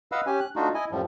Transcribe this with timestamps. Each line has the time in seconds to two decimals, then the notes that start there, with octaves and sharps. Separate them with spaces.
0.12 B4 D#5 F5 F#5 B5 E6
0.27 C#4 G4 G#5
0.40 F#6
0.56 A3 D4 D#4 F4 F#4
0.74 E4 D#5 G#5
0.91 F#2 A2 F3 G3